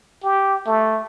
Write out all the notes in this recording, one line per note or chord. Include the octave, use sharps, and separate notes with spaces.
G4
A3